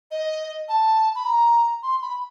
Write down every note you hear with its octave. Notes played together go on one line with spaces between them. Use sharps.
D#5
A5
B5
A#5
C6
B5